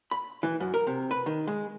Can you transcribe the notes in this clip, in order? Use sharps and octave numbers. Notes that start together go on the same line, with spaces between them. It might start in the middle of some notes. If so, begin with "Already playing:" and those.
B5
E3
F#2
A#4
C3
B4
D#3
G#3